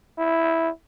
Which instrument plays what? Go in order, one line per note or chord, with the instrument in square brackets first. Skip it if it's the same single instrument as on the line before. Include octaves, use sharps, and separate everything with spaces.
[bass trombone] E4